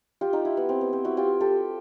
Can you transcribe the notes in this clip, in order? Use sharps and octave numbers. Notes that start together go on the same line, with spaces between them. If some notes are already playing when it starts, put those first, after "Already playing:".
F4 G4
D#4 F4
E4
B3
C4
B3
C4
E4 F#4
F4 G4
G4 A4